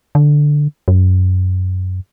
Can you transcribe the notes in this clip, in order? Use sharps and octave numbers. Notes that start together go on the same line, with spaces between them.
D3
F#2